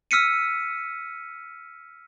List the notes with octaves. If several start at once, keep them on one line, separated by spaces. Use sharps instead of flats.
E6 F6 B6 C#7 D#7